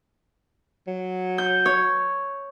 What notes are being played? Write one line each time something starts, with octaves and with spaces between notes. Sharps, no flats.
F#3
G6
C#5